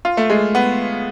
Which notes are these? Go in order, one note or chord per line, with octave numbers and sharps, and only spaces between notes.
F4
A3
G#3
B3